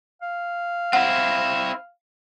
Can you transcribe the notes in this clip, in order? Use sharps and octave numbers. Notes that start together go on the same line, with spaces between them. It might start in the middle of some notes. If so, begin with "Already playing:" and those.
F5
C4 E4 F#5